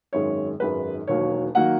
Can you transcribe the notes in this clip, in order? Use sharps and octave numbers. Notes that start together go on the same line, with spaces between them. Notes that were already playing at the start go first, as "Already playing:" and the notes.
G#1 F#2 D#3 G#3 C#5
G#1 F#2 D#3 G#3 B4
E1 D#2 D#3 F#3 A#3 C#5
D#3 F#3 A#3 F#5